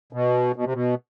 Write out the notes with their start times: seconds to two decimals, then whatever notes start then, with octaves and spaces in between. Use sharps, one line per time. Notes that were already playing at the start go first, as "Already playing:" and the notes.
0.13 B2
0.56 B2
0.65 C3
0.73 B2